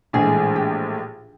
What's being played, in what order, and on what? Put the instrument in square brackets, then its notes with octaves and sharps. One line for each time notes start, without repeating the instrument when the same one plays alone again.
[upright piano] A#1 A2 E3 G#3 [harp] G#4
[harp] G4